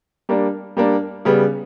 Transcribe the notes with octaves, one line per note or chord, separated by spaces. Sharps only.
G3 A#3 D4
G3 A#3 D4
C#3 G3 B3